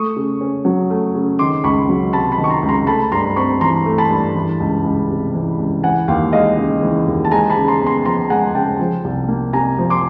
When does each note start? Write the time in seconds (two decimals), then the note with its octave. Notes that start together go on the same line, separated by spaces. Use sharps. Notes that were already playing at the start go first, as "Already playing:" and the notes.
Already playing: A3 C#6 D#6
0.16 C#3
0.41 C#4
0.65 F#3
0.90 A3
1.15 C#3
1.39 D#3 C6 D6
1.64 C#2 B5 C#6
1.89 F#3
2.13 C3 A5 B5
2.32 A5 B5
2.38 D#3
2.44 C#6
2.50 A#5 C6
2.63 C#2
2.69 A#5 C6
2.87 A3 A5 B5
3.12 G2 A#5 C6
3.36 C4 B5 C#6
3.61 E3 A#5 C6
3.86 A3
3.98 A5 B5
4.11 G2
4.35 E3
4.60 C#2
4.84 C#2
5.10 C3
5.34 E3
5.59 C#2
5.83 E3 F#5 G#5
6.08 D#2 F5 G5
6.33 G#3 D#5 F5
6.57 C#3
6.82 E3
7.06 D#2
7.25 A5
7.31 G#3 G#5 A#5
7.50 A5 B5
7.56 C#3
7.68 A#5 C6
7.81 B3
7.86 A#5 C6
8.05 F3 A#5 C6
8.30 G#3 F#5 G#5
8.55 C#3 G5 A5
8.80 F3
9.04 C2
9.28 A#3
9.53 C3 G#5 A#5
9.78 F3
9.90 C6 D6